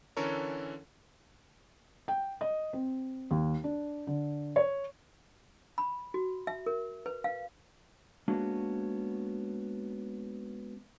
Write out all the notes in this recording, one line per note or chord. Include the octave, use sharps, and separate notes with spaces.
D3 E3 C#4 A4 A#4 C#5
G5
D#5
C4
D#2
D4
D3
C#5
B5
F#4
E5
A#4
B4
F5
G#3 A#3 B3 C#4 D4 F#4